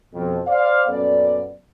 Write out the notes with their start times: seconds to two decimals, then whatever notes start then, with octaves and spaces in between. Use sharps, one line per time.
0.13 F2 B2
0.47 C5 D5 F5
0.88 F#2 A#2 B3 C#4 A4 D5